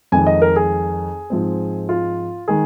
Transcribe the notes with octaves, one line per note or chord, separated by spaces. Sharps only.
F2 D#3 G#3 G#5
D#5
A#4
G#4
G#2 F3 G#3 C4
F4
D#3 G#3 G#4